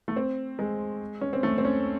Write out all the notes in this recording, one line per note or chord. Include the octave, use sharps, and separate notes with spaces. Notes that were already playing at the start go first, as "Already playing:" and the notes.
A3
C4
G#3
C#4
C4
A3
C4
C#4